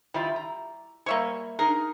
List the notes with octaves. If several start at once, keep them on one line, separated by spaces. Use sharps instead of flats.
D#3 G3 E4 F4
A#5
G3 A#3 C#5 E5 C#6
D#4 G#4 A#4